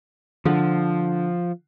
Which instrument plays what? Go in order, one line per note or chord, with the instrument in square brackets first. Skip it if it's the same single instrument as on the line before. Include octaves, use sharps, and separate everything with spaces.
[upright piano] D3 [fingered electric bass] F3